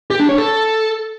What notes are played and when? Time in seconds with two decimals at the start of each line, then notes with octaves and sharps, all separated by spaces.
0.10 G4
0.20 D4
0.29 C#5
0.38 A4